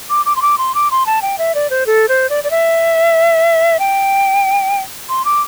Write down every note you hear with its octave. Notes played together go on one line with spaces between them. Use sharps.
D6
D6
C6
D6
C6
D6
C6
A5
G5
E5
D5
C5
A4
C5
D5
D5
E5
G5
C6
D6